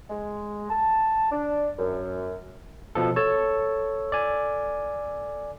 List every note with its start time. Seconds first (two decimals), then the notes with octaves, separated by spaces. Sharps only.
0.09 G#3
0.69 A5
1.31 D4
1.77 F#2
2.95 B2 F3 A4
3.16 A4 C#5
4.12 D5 G#5